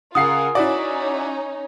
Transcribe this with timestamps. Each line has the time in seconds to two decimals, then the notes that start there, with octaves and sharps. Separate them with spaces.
0.15 C#3 F4 G#4 A#4 F#5 D#6 C7
0.55 C#4 D#4 E4 F#4 C#5 D5